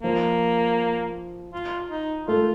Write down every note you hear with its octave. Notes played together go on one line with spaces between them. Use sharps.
F3 A#3
F4
D#4
A3 F4